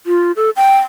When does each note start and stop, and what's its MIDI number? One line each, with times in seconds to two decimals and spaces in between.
0.06 0.32 65
0.36 0.50 69
0.56 0.78 79